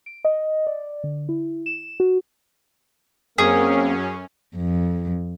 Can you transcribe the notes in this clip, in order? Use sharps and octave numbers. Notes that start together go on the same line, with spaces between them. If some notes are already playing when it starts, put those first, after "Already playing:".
D7
D#5
D5
D3
E4
E7
F#4
F#2 A#3 C4 C#4 G#4 A#4
F2